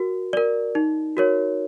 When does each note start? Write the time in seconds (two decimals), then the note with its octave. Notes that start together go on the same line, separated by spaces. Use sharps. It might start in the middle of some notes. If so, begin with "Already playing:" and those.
Already playing: F#4 A#4
0.33 A#4 D5
0.75 D#4
1.17 F#4 A#4 C#5